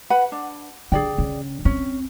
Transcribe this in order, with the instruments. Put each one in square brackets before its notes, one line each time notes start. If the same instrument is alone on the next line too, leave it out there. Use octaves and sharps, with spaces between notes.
[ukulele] B4 F#5 B5
D4
[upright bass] D3 [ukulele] G#4 D5 G5
[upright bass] C#3
[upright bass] C4 [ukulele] C#4